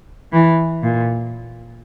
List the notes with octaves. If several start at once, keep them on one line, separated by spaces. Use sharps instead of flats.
E3
A#2